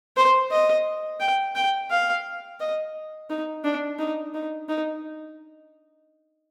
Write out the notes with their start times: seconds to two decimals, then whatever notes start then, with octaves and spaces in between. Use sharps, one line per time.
0.17 C5
0.51 D#5
1.20 G5
1.55 G5
1.90 F5
2.60 D#5
3.30 D#4
3.64 D4
3.99 D#4
4.34 D#4
4.69 D#4